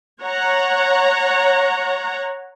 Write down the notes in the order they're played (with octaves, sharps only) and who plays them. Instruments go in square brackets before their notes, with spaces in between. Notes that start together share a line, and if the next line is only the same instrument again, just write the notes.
[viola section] C#5 F#5 A#5